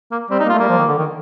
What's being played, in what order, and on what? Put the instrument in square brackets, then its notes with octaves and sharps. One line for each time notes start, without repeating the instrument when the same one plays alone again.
[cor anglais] A#3
[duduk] G3 [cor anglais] C4
[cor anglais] D#4
[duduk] A#3
[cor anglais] F4
[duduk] A3
[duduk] G3 [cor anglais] A#3
[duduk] F3
D#3
D3
D#3